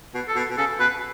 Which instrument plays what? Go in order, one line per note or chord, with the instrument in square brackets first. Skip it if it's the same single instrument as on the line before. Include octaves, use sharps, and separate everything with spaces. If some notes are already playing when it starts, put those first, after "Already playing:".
[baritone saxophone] B2
[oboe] A4
[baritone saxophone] B2
B2
[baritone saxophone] C#3 [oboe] A4
[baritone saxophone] B2 [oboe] B4